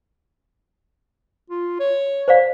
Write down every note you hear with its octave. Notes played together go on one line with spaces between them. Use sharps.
F4
C#5
C5 D5 F5